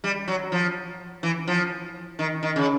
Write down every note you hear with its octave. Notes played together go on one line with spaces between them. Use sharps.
G3
F#3
F3
E3
F3
D#3
D#3
C#3